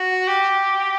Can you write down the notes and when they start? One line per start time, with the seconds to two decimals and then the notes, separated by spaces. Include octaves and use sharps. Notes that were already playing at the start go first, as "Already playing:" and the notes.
Already playing: F#4
0.28 G4